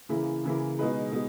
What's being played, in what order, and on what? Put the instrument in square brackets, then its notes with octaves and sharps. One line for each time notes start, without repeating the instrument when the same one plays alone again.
[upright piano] C#3 E3 A#3 E4 G#4
C#3 E3 A#3 E4 G#4
B2 G#3 D#4 G#4 B4
B2 G#3